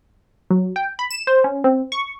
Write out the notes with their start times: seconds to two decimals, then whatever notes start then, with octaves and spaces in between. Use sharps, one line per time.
0.50 F#3
0.76 G5
0.99 B5
1.11 E7
1.27 C5
1.44 C#4
1.64 C4
1.92 C#6